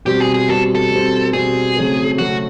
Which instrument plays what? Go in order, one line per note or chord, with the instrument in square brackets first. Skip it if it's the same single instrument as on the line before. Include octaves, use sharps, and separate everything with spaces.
[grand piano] B2 G3 C4 [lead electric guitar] G4
[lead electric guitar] G#4
G#4
[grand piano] B2 G3 C4 [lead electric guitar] A4
[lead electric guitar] A4
[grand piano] B2 G3 C4
[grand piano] B2 G3 C4 [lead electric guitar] G#4
[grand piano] C#3 F#3 A3 C4
[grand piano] C#3 F#3 A3 C4 [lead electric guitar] F#4